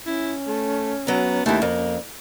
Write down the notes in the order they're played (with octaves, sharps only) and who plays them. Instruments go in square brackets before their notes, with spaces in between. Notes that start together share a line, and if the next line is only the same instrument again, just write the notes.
[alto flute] C#4 [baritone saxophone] E4
[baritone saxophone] A3
[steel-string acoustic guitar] F#3 A#5 [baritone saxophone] B3
[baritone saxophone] D#2 [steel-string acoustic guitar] A3 E4
[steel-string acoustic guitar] F2 [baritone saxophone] A#3